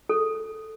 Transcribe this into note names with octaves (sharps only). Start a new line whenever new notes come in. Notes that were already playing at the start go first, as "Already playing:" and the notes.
A4